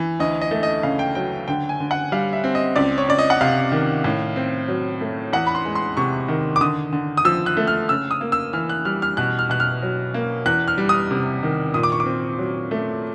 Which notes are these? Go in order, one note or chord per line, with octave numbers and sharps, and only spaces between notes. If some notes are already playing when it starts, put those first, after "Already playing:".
Already playing: E3
D2 D#5
D#5
A3
D#5
C#3 F5
G5
F#3 G5
D3 G5
G#5
D3
F#5
G3 F5
E5
C4
D#5
C#2 D5
C#5
C#2 D5
D#5
F#5
C3 F5
D#3
A2
C4
F#3
A3
E2 F#5
B5
C6
G#3
C6
C3 C#6
D#3
D6
D3 D#6
D3
D#6
F3 E6
F#6
A3
F6
C#3 E6
D#6
A#3
E6
E3 F6
F#6
G3 F6
F6
B2 F#6
F6
B2 F#6
F6
F#3
A#3
E2 F#6
F6
G3
D#6
C3
D#3
A#2 D#6
D6
C#6
D6
C4
F#3
A3